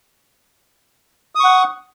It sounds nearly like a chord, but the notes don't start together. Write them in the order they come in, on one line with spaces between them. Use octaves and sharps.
D#6 C#6 F#5